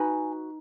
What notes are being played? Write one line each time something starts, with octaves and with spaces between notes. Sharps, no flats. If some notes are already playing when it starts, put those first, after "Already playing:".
Already playing: D#4 F#4 B4 G#5 B5